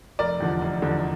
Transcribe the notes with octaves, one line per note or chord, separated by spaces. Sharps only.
F1 A#4 D5
E2 D3 F3
F1
E2 D3 F3